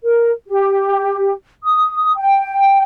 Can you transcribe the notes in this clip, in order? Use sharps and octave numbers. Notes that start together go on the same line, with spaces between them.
A#4
G4
D#6
G5